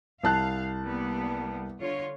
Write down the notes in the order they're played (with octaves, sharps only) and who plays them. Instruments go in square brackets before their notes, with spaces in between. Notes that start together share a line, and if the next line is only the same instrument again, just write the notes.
[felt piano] C2 A5 F#6 [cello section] F5
[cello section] G3 A#3 B3
D3 F4 C#5